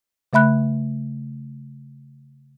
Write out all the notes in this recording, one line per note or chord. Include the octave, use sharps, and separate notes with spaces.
C#3 A3 E5 B5 F#6